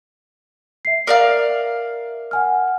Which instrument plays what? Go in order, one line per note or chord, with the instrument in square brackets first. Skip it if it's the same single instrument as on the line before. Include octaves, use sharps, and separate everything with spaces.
[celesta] E5 C7
[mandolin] A#4 D5 F5
[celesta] F#5 G#5 F6